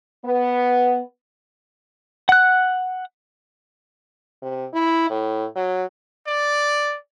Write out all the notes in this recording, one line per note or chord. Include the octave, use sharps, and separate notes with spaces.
B3
F#5 F#6
C3
E4
A2
F#3
D5